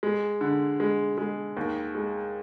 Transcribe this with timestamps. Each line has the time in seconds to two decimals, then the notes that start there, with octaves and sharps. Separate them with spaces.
0.03 G#3
0.41 D3
0.80 G#3
1.18 G#3
1.57 D#2
1.95 G#3